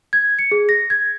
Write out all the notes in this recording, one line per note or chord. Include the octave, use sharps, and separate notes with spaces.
G#6
C#7
G#4
A#6
G#6